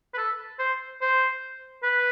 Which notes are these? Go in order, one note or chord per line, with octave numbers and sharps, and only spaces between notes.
B4
A4
C5
C5
B4